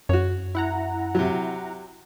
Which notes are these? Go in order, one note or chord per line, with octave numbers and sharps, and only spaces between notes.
F#2 F#4 C#5
E4 F#5 A#5
C3 F#3